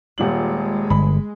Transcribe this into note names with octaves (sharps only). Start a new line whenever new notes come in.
D#1 A#2 G#3 F#7
G1 B5